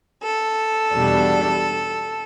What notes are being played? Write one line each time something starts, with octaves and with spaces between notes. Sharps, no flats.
A4
E2 B2 G3 D4